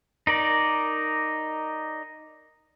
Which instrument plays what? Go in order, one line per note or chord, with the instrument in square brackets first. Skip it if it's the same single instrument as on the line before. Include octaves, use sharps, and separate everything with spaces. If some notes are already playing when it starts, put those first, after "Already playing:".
[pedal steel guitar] D#4 A#4 D5